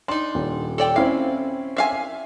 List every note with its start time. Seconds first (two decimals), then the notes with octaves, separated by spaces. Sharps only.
0.08 D4 D#4 C6
0.35 D#1
0.78 A4 D5 G5
0.96 C4 C#4 E4 F5
1.77 E5 F5 G#5